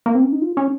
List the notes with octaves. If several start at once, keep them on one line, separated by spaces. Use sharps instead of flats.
A#3
C4
C#4
D#4
F4
C#4